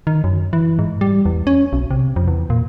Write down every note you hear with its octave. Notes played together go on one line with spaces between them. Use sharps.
D#3
F#2
E3
G#2
G3
E2
C#4
B1
C3
F2
E2
A#2